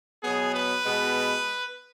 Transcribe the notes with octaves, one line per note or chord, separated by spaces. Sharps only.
B2 F#3 B3 G#4
B4
B2 G#3 B3